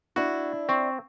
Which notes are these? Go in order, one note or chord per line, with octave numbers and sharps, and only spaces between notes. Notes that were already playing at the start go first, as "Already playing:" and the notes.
D4 E4 F#4
C4 C#6